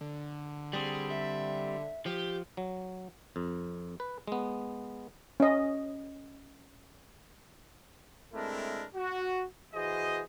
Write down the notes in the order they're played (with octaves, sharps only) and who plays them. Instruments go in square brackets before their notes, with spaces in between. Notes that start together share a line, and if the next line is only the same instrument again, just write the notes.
[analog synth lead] D3
[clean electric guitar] G3 C4 [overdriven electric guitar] G#4
[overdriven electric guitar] E5
[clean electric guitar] F3 [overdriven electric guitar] G4
[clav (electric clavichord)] F#3
F2
B4
G#3 B3
[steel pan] C#4 D#5
[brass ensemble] G#3 A3 C4 D4 E4 A#4
F#4
E3 F#4 G#4 C5 D#5